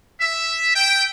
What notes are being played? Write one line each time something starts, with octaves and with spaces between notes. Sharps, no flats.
E5
G5